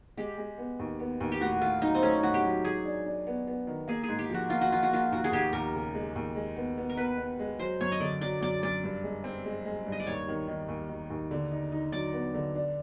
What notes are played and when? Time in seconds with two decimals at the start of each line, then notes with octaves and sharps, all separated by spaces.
0.17 G#3 G4
0.38 G#3
0.58 B3
0.79 D#2
1.00 B3
1.20 D#2
1.32 G4
1.41 A2 F#4
1.61 A2 F4
1.82 F#3 D#4
1.95 C4
2.03 A3 C#4
2.23 A2 F#4
2.34 G4
2.43 F#3
2.64 G#3 G#4
2.85 D4
3.05 D4
3.27 B3
3.48 B3
3.67 D#3
3.88 A#3 G#4
4.03 G#2 G#4
4.19 G4
4.30 F3 F#4
4.50 A#3 F4
4.61 F#4
4.71 F3 F4
4.83 F#4
4.91 A#3 F4
5.12 D#2 F#4
5.24 G#4
5.32 D#2 G4
5.53 D#2 A#4
5.74 C#3
5.94 G#3
6.16 D#2
6.36 G#3
6.56 B3
6.78 B3
6.89 A#4
6.97 B3 B4
7.18 B3
7.39 G#3
7.59 F#3 C5
7.81 F#2 C#5
7.92 D#5
8.00 D3 D5
8.21 F#3 D5
8.41 F#2 D5
8.63 F#2 D5
8.84 G2
9.03 G#3
9.24 C4
9.45 G#3
9.65 G#3
9.86 G2
9.92 D#5
10.00 D5
10.07 D#2 C#5
10.28 D#3
10.48 D#3
10.68 D#2
10.89 D#3
11.10 D#2
11.31 D3
11.51 D#4
11.72 D#4
11.92 F#3 D5
12.13 B3
12.34 D3
12.55 D4